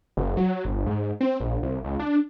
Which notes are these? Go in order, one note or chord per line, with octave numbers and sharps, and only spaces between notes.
F#1
F#3
G1
G#2
C4
A#1
C2
C#2
D4